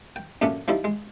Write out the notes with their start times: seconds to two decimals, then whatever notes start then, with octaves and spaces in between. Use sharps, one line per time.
0.16 G5
0.42 F#2 A#2 A3 C#4 D4
0.68 F3 G3 D#4 E4
0.84 G#3